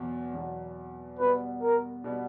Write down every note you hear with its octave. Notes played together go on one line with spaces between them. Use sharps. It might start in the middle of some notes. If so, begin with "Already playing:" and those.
Already playing: E2 B2 F#3
E2 B2 F#3
B2 G3 B3 B4
A#4
B2 G3 B3